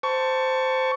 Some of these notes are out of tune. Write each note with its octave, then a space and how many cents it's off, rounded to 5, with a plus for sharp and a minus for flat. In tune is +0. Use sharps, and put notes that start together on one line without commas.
C5 -10 A5 +15 C#6 +15